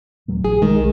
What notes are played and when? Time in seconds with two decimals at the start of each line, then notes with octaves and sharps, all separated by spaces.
0.28 D#1 F#3 A3
0.45 A#1 G#4
0.62 B1 D#3 G#3